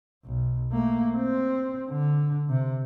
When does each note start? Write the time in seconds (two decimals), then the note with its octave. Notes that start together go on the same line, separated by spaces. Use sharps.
0.25 B1
0.72 A3 A#3
1.16 C4
1.90 D3
2.49 C3